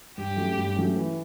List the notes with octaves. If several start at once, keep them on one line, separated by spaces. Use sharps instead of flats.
G2 G4
F#3 A3 C#4
G2
F#3 A3 C#4
E3